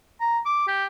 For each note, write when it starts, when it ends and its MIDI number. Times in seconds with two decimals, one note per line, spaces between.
0.20 0.39 82
0.45 0.64 86
0.67 0.85 67